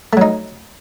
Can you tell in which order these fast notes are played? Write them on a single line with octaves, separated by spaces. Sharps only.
A3 F#3 D#4